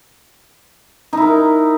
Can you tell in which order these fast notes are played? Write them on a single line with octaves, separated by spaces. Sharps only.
D#4 E4 A#4